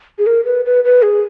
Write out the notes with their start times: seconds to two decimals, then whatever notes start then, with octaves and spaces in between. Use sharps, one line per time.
0.19 G#4
0.27 A#4
0.45 B4
0.65 B4
0.84 B4
1.02 G#4